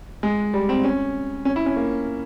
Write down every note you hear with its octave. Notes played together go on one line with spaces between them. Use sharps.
G#3
G3
C4
C#4
C#4
E4
C#4
A#3